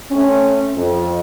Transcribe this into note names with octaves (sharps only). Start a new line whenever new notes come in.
A3 C4 C#4
F2